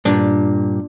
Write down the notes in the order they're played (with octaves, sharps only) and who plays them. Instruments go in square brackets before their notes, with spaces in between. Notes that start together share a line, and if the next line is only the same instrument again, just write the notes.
[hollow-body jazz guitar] G2 A#2 [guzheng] D4